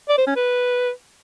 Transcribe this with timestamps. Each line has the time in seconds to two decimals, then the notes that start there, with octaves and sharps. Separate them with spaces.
0.09 D5
0.18 C5
0.27 C#4
0.36 B4